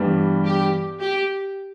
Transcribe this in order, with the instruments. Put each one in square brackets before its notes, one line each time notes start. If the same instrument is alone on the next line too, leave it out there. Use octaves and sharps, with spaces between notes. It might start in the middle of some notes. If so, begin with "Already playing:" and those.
Already playing: [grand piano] G2 E3 G3 B3
[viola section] G4
G4